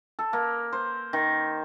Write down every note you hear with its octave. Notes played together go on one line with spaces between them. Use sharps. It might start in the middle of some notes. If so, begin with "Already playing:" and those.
A4
A#3
C5
D#3